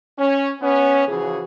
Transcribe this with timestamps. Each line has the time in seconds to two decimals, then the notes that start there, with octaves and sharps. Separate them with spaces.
0.19 C#4
0.62 B3 C#4
1.08 C#3 E3 F3 F#4 G#4